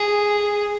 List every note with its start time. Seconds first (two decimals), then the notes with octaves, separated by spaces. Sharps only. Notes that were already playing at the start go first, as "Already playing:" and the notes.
Already playing: G#4